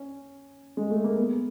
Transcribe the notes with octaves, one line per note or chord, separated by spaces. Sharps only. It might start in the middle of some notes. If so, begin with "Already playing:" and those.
Already playing: C#4
G#3
A3
A#3
B3